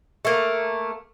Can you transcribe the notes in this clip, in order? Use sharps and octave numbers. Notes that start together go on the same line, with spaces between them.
A3 A#3